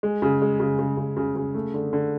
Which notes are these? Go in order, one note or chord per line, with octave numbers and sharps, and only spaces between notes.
G#3
C#3
G#3
C#3
C#3
C#3
C#3
C#3
A3
D3
D3